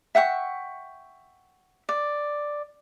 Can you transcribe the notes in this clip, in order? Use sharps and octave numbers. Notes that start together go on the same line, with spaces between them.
E5 F#5 G5 C#6
D5